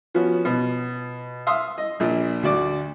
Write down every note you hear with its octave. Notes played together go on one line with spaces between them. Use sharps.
F3 B3 C#4 F#4
B2
E5 F5 C6 D#6
D#5
A#1 A#2
D2 F#4 D5 D6